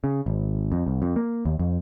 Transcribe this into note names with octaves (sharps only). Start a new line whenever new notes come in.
C#3
G#1
F2
C2
F2
A#3
D#2
F2